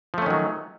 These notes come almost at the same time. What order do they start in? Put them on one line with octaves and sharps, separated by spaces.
F3 A3 C#4 D#3 F#3